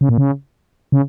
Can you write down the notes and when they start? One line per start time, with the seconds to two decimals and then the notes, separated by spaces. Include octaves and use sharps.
0.01 C#3
0.09 A#2
0.18 C#3
0.92 C#3